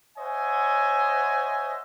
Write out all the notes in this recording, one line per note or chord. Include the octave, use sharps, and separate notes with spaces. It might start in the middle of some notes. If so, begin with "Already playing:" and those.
C5 C#5 D#5 E5 F#5 G#5